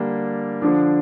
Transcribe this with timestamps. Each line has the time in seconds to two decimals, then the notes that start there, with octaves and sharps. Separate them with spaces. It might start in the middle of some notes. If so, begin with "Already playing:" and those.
Already playing: D3 G3 A#3 D4 G4
0.62 D3 F3 D4